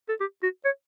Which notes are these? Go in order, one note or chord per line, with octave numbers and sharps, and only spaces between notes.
A4
G4
F#4
C#5